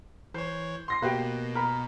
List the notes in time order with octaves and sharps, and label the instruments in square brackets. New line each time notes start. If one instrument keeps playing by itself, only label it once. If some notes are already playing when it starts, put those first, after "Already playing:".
[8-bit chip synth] E3 C#5 [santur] C5
[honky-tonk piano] C6 A#6 C7
[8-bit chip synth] B2 [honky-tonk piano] A#3 F#4 G4 [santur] B4
[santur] A#4 B5